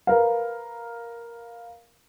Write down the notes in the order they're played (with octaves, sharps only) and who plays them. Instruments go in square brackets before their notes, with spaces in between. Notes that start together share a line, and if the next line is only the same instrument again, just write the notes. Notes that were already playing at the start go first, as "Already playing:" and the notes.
[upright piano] A#4 B4 F5